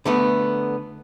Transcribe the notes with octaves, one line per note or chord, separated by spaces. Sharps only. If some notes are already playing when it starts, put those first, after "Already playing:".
D3 A3 B3